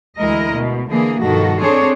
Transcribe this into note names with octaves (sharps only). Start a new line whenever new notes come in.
D2 E3 G#3 E4 A#4 D#5
B2
D3 E3 A#3 G#4
G2 B2 D#3 F3 F#4 A4
C4 D4 G#4 A4 C5 C#5